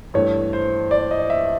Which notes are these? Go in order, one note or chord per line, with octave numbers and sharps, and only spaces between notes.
G2 E3 A3 C#5
C5
D5
D#5
E5